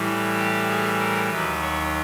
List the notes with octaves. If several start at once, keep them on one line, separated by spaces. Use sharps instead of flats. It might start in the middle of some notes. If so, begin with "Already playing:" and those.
Already playing: A2 E3 G3
G4
G#4
A#4
D#2 D#3 F#3 B4
C#5